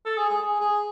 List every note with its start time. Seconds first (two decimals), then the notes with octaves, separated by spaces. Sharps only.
0.05 A4
0.18 G#4
0.30 G#4
0.42 G#4
0.60 G#4